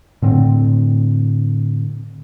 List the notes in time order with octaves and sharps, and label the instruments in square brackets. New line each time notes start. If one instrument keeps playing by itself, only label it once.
[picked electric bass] A2 D3 C4